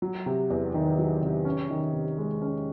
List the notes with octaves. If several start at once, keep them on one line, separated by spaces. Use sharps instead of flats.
F#3
C3
E2
D#3
F#3
C3
C#4
D#3
C3
G#3
C#4